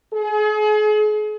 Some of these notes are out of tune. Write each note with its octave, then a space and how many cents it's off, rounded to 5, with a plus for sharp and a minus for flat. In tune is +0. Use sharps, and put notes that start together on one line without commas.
G#4 +40